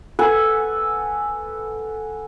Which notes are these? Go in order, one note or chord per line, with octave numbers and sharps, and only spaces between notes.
A4 B4 F#5 G#5